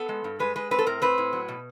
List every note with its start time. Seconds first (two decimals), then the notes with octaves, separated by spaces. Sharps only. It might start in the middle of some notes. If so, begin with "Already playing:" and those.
Already playing: B3 A4
0.09 G#3
0.24 G2
0.40 G#3 B4
0.56 G#3 B4
0.71 C4 B4
0.79 A4
0.86 A2 A#4
1.02 C4 B4
1.18 A2
1.33 F#3
1.48 B2